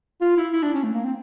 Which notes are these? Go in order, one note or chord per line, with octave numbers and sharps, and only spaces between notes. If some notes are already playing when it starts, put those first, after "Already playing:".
F4
E4
E4
D4
C#4
A3
A#3
C4